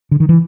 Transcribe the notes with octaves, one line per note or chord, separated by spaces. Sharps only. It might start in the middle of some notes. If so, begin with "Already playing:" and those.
D3
D#3
E3